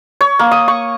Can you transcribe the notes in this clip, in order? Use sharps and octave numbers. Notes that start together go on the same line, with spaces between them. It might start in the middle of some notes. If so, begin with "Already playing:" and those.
C#5
A#3
D#6
C#6